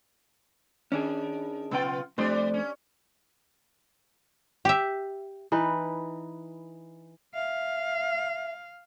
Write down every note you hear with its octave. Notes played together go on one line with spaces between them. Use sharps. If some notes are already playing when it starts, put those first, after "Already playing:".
D#3 C#4 D4 G#4
B1 C#3 B3 F4 G5
F2 G3 A3 D4 C5 D5
C#4
G4 E5
E3 D#4 B4
E5 F5